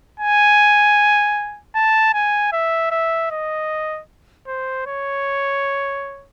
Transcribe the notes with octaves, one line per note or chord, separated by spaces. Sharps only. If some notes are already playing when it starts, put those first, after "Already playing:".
G#5
A5
G#5
E5
E5
D#5
C5
C#5